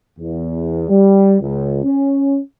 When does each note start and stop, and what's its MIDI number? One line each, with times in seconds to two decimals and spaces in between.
0.19 0.87 40
0.89 1.35 55
1.40 1.82 37
1.83 2.38 61